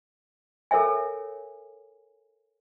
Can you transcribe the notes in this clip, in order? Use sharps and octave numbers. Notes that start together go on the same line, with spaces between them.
A4 A#4 C#5 E5 G#5